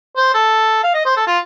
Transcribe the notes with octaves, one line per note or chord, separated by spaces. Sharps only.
C5
A4
F5
D#5
C5
A4
F4